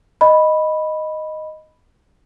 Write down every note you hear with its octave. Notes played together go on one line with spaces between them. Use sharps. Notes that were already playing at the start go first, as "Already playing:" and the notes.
D#5 B5